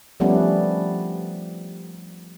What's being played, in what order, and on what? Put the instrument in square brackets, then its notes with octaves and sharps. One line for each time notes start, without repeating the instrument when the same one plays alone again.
[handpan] F3 G3 A3 B3 C#4 D4